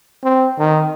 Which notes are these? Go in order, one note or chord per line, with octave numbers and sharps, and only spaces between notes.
C4
D#3